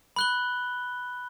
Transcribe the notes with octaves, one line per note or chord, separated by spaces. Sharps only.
B5 F#6 G7